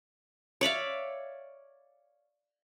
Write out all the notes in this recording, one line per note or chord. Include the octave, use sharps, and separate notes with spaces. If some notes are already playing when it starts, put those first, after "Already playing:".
C#5 D5 E5 F5